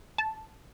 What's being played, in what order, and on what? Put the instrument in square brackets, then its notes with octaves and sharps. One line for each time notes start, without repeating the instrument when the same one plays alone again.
[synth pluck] A5